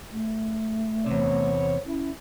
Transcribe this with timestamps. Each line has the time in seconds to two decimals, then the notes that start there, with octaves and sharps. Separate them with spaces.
0.12 A3
1.06 E2 C3 B3 C5 C#5
1.86 C#4 E4